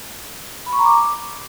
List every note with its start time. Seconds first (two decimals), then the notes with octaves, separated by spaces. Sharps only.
0.66 B5
0.73 C#6
0.79 A#5
0.85 D6